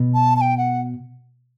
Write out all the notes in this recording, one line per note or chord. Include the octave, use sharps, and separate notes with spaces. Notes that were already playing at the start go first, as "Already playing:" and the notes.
Already playing: B2
A5
A5
G5
F#5